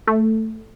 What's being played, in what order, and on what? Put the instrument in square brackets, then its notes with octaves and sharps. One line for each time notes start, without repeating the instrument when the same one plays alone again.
[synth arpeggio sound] A3